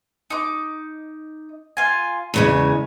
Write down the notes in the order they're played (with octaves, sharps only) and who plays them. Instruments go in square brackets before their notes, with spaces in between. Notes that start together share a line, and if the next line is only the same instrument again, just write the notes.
[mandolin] D#4 D6
F4 G#5
[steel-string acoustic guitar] E2 C#3 G#3 [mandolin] C#5